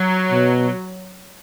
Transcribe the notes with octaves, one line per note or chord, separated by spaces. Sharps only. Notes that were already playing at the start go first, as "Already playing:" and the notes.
Already playing: F#3
B2